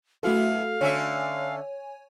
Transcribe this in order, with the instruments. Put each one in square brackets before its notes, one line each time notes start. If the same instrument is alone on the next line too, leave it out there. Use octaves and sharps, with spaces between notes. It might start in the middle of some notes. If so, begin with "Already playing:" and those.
[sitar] F#2 B3 E4 [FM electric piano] A3 F#4 A4 [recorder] F5
[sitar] D3 C#4 E5 [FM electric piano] C#5 G#5